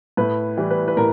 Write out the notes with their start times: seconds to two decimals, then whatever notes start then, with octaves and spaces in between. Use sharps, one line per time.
0.17 A2 B4
0.57 E3 G3
0.71 B4
0.88 B4
0.97 A2 A#4